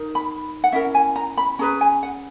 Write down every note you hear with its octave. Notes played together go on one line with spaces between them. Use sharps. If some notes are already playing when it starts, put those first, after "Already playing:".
Already playing: D#4 A#4
B5
F#5
C#4 E4 A#4 E5
G#5
A#5
B5
C#4 G#4 B4 A#5
G#5
F#5